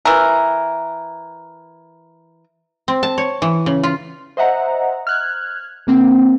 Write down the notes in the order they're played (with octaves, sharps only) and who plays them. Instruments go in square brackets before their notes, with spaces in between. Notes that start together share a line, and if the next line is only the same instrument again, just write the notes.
[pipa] E3 A#4
[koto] C4
A5
C#5
E3
C#3
F4
[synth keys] C5 D#5 E5 F#5 A#5
F6 F#6 G#6
C#3 A#3 C4